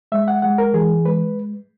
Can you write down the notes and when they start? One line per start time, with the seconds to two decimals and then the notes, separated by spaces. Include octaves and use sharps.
0.12 G#3 E5
0.28 F#5
0.42 G#3 F#5
0.58 A#4
0.73 E3 G#4
1.05 G#3 B4